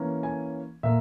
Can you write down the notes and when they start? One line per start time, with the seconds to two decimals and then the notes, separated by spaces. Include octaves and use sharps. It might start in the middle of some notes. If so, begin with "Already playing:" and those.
Already playing: E3 A#3 C#4
0.23 G#5
0.83 A#2 A#3 E5